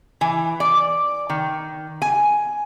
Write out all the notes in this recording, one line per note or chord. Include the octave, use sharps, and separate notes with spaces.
E3
D5
D#3
G#5